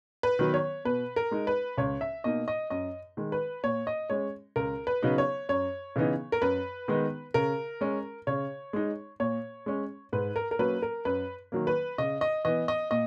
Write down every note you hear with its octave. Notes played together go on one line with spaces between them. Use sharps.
B4
D#3 F#3 B3
C#5
B2 B4
A#4
G#3 D#4
B4
C#2 C#5
E5
B2 A#3 D#4 D#5
D#5
F#2 D#5
D#3 G#3
B4
A#2 C#5
D#5
G#3 C#4 C#5
C#2 A#4
B4
C#3 F#3 B3 D#4
C#5
F#2 C#5
C#3 E3 B3 D#4
A#4
F#2 B4
D#3 G#3 B3 D#4
C#3 A#4
G#3 C#4
C#3 C#5
G#3 D#4
A#2 C#5
G#3 C#4
G#2 B4
A#4
A#4
F#3 A#3 C#4 B4
A#4
F#2 B4
D#3 F#3 A#3
B4
C#3 D#5
D#5
E3 B3 D#5
D#5
A#2 D#5